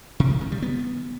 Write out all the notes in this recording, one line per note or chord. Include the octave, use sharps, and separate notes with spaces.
C3
D#3
D#3
G3
B3